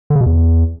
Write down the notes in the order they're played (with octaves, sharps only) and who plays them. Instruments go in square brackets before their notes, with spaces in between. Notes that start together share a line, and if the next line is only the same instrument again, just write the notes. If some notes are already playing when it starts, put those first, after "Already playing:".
[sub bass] D3
C#3
B2
E2